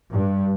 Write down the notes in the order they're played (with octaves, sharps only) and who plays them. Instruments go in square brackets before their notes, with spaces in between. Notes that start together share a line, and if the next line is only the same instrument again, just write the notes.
[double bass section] G2